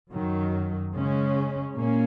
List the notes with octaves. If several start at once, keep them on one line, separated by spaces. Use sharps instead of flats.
F#2 D#3 F#3
C#3 G#3 C#4
A#2 A#3 C#4